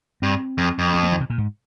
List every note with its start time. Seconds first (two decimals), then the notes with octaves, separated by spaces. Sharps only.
0.22 G2 C4
0.58 F2
0.79 F2
0.94 C4
1.03 A#3
1.12 D#3
1.20 C3
1.30 A#2
1.38 G#2